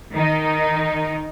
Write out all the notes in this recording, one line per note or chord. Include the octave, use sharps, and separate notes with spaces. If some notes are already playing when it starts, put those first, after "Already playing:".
D#3 D#4